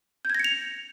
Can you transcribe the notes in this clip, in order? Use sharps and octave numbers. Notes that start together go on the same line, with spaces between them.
G6 G#6 A#6 C#7 F7